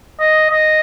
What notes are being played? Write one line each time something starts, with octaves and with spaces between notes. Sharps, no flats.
D#5
D#5